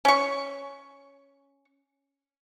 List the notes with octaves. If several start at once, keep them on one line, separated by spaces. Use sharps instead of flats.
C#4 C#6